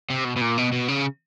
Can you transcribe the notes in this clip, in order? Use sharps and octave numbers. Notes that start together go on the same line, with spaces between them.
C3
B2
B2
A#2
B2
B2
C#3